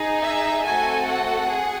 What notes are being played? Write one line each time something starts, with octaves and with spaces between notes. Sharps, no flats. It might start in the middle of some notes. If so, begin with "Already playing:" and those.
Already playing: D#4 G#4
E5
A3 C4 F#4 A4 G#5
F#5
G#4